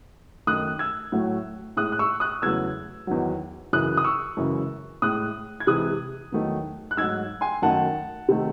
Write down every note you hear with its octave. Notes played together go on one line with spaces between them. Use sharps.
F#2 D#3 A3 D#6 F#6
E6 G#6
A2 F#3 A3
A2 G#3 D#6 F#6
F#6
C#6 E6
D#6 F#6
E2 C#3 F#3 A3 E6 G#6
E2 D#3 F#3
F#2 C#3 E3 D#6 F#6
D#6
C#6 E6
F#2 C#3 E3 G#3
A2 G#3 D#6 F#6
G#6
C3 E3 G#3 D#6 F#6
E2 D#3 F#3 A3
F#6
G#2 F#3 A3 E6 G#6
G#5 C6
F#2 D#3 A3 F#5 A5
C3 D#3 A3